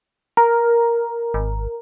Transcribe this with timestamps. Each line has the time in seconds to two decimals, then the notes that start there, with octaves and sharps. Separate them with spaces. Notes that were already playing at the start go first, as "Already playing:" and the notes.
0.37 A#4
1.34 G#1